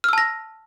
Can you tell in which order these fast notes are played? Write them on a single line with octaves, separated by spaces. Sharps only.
F6 E6 A5 A#6